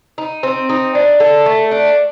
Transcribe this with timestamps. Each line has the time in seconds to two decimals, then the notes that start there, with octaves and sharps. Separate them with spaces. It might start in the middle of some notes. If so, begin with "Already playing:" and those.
0.18 D#4
0.43 C4
0.69 D#4
0.95 D4
1.20 A4
1.46 A3
1.71 D4